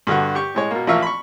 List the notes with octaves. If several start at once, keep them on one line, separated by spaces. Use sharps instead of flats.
G2 D3 F#4
G4 C#6
A2 G#3 C#5
B2 A#3
A1 F3 A#3 F4 E5 C#6
B5 C#6